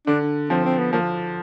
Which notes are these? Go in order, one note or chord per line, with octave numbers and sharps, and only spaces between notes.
D3 D4
F3 C4
C4
B3
F3 A#3